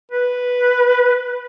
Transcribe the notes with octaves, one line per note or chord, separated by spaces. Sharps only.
B4